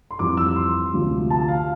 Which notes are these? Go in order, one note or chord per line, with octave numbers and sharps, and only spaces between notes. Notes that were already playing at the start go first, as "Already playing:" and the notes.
C6
F2 E3 G3 D6
E6
C6
D2 C3 F3
A5
F5